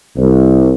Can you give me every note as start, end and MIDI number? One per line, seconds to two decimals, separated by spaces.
0.17 0.72 36